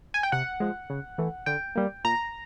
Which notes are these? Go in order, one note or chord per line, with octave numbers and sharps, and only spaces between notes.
G#5
G5
C3 F#5
F3 G#3
C#3
E3 A3
D3 G5
G3 A#3
A#2 A#5